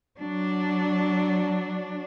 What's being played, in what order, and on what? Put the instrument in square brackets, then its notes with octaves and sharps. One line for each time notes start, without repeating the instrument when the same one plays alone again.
[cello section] F#3 D4